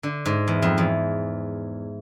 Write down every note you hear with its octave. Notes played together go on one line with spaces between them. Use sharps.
D3
G#2
E2
F2
E2